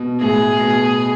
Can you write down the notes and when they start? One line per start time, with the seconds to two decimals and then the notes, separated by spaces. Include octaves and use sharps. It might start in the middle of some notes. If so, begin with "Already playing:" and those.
Already playing: B2
0.21 A2 G#4
0.60 B2